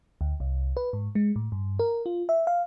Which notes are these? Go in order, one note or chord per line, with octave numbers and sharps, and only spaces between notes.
D2
C2
B4
G#2
G#3
A2
G2
A#4
F4
E5
F5